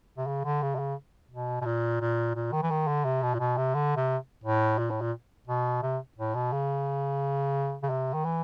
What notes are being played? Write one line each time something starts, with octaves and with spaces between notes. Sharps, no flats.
C3
C#3
D3
C#3
C3
C#3
B2
B2
A#2
A#2
A#2
D#3
E3
D#3
D3
C3
B2
A#2
B2
C3
D3
C3
A2
A#2
A2
A#2
B2
C3
A2
B2
C#3
C#3
C3
D#3
E3